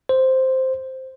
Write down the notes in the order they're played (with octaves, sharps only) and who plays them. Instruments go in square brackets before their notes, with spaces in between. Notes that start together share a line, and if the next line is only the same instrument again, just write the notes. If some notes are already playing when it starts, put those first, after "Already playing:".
[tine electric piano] C5